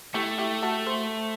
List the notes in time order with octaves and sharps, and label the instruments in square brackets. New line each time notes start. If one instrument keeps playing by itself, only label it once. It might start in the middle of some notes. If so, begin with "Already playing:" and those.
[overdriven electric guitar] A3 [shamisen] E4 G4
[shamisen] E4 G4
F#4 A4
A4 C5